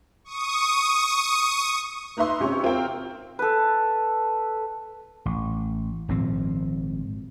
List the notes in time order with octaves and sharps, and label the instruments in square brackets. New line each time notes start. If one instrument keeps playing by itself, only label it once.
[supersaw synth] C#6 D#6
[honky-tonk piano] A#3 D#4 B4 E5 C6
G#1 C3 C#4 G4 C#6 E6
C4 F4 A#4 F5 G5
[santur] A4 B4
[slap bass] A1
G#1 A#2 F3 C4